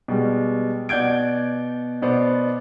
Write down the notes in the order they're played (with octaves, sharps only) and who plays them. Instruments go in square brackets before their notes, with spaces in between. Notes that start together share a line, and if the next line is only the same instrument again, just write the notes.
[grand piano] B2 G3 G#3
B2 D5 F#5 G6 G#6 D7
B2 B3 C5 D5